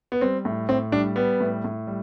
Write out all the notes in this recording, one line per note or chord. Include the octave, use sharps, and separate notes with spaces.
B3
G3 C4
A2
A2 C4
G3 D4
G3 B3
A2
A2
G3